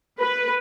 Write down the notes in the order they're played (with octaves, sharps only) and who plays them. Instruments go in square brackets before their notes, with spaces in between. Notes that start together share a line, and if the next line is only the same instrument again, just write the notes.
[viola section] B4